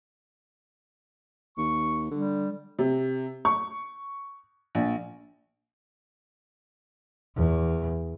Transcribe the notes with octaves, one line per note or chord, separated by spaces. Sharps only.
D#2 C#6
D3 G3
C3
C#6
A#1
E2